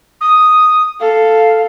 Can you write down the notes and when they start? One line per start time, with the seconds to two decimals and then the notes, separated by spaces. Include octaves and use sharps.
0.20 D#6
1.00 A4 F5